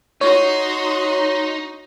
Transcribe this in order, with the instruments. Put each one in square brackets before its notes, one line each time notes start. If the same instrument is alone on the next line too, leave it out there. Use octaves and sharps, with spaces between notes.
[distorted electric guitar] D#4 [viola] F#4 C6 [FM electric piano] C#5